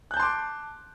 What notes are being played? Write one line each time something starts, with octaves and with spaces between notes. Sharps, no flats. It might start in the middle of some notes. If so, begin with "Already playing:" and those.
A5 C6 D6 F#6 G6